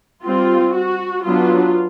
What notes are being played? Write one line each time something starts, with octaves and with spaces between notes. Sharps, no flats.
G3 C4 F4
F#4
F#3 B3 D4 F4